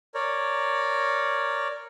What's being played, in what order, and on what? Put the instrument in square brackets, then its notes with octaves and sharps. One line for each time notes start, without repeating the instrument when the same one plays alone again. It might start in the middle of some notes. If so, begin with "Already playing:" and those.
[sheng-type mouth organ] A#4 C#5 D5